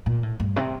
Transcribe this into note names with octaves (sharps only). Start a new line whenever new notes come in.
A#2
A2
G2
C3